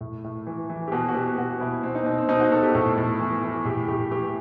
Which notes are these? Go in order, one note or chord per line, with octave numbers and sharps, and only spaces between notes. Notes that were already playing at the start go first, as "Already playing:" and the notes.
A2
A2
E3
E3
G4
B2 F#4
F#4
B2 G4
B2 F#4
B2 E4
B2 C4
D#4
B2 C4
C4
B2 D#4
F#4
B2 A4
G4
A2 A4
A2
E3
E3
A2 G4
A2 G4
E3 G4